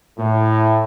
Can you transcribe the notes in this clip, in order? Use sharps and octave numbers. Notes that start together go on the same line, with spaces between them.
A2